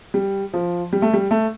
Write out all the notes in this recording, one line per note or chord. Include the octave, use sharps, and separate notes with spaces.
G3
F3
G3
A3
G3
A3